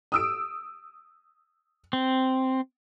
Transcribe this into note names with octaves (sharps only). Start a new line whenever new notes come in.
D#6 E6 D7
C4